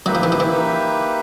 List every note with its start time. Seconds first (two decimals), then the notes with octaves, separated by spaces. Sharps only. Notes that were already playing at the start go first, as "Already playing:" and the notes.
0.06 F#3 A#3 D#4 G4 B4 E5
0.15 F3
0.23 E3
0.32 F3
0.40 E3